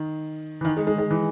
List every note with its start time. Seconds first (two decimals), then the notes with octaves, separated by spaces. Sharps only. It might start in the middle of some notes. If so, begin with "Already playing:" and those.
Already playing: D#3
0.61 E3
0.65 D#3
0.77 G#3
0.87 G#3
0.98 G#3
1.11 E3